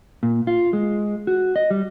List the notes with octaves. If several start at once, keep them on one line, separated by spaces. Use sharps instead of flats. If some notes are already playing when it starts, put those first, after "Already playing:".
A#2
F4
G#3
F#4
D#5
G3